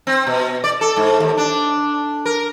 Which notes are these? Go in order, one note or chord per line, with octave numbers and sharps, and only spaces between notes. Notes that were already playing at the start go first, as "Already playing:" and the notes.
C4
B2
D5
A4
G#2
D#2
D4
A#4